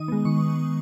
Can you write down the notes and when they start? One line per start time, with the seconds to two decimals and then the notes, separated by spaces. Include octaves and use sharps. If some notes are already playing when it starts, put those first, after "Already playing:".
Already playing: D#3 D#6
0.08 G#3 B3
0.25 D#3 C#6